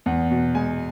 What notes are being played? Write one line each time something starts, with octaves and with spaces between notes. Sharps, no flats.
E2 F#5
B2
G#3 G#5